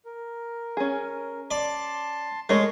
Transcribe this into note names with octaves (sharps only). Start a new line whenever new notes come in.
A#4
C#4 G#4
D5 A5 C6
G#3 A3 A#4 C#5